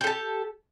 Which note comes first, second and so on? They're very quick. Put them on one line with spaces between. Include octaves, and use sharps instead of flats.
G4 A4 A5